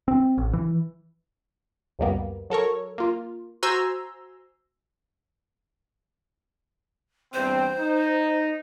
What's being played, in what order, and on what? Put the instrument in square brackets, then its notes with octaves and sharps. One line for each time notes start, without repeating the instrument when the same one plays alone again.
[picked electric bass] C4
A1
E3
[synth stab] C#2 F#2 G3 A#3 B3
F#3 A4 A#4 C#5
A#3 F4
F#4 C5 G#5 A#5 C6 E6
[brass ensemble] E2 G2 C4 [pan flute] C5
[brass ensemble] D#4